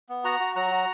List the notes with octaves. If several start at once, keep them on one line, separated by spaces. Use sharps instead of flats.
B3
F#4 F#5 A#5
F#4
F#3 F#5 A#5
F#4